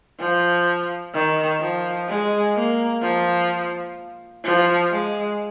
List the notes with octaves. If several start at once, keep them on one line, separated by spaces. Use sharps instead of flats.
F3
D#3
F3
G#3
A#3
F3
F3
G#3